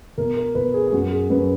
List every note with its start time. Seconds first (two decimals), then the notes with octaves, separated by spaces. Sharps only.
0.18 B2 A#4
0.37 A#4
0.55 B2 B4
0.74 G#4
0.87 G#4
0.92 F#2 F#4
1.11 G#4
1.30 F#2 B4